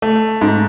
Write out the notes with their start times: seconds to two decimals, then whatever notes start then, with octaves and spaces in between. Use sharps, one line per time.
0.02 A3
0.41 G#2